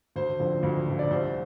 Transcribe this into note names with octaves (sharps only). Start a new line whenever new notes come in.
D2 C5
D3 F3 C4
D2
D3 F3 C4
D5
C2 C5